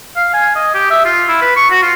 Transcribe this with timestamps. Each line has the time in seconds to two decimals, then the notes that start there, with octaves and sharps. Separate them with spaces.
0.16 F5
0.34 G#5
0.55 D#5
0.74 G4
0.91 E5
1.05 F4
1.29 E4
1.42 B4
1.57 C#6
1.71 F#4
1.82 F4